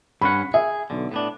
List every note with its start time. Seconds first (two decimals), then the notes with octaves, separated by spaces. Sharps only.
0.21 G2 C#4 F#5 B5
0.54 G#4 E5
0.90 B1 D3
1.12 A2 B3 D4